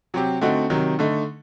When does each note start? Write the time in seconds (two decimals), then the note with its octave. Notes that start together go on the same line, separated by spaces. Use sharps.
0.14 C3 F#3 C4 G4
0.41 D3 A3 C4 D#4 F#4
0.70 C3 D#3 F#3
0.99 D3 A3 D#4